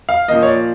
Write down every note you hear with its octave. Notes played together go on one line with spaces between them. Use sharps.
F5
A#2 F3 A#3 D#5
C#5
D5